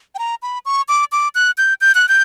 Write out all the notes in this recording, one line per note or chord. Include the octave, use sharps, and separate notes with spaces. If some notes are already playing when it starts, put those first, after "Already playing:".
G5
A#5
B5
C#6
D6
D6
F#6
G6
G6
F#6
G6